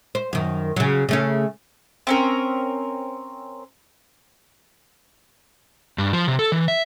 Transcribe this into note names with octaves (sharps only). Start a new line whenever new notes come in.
C5
F#2 D#3
C#3 F#3
C#3 A3 C#4
C4 C#4 A#4
G2
F3
C3
A4
E3
E5